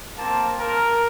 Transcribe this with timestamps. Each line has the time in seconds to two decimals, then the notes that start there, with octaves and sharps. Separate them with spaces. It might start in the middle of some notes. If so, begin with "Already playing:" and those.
0.17 A#3 C4 F5 A5
0.58 A#4